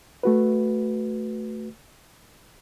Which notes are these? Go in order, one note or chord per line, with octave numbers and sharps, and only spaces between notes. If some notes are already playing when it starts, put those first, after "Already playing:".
A3 F#4 B4